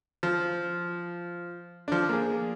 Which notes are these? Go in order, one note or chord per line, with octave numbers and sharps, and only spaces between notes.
F3
F3 D4
A#3 G#4